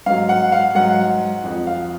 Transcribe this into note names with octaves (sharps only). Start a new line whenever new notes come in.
G#2 F#3 F5
F#5
F5
G#2 F#3 F#5
F2 F3
F5